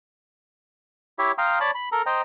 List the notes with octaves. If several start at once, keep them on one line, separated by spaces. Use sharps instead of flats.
E4 G4 C#5 E5
F5 G5 A#5 C6 D#6
C#5 D5 A5 B5
B5
A4 A#4 A#5
C5 D#5 G5 A#5